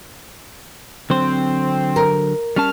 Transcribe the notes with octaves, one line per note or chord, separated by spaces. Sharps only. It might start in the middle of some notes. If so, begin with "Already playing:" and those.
D3 F#3 C4 C5
A#4
G3 C#4 A5 F6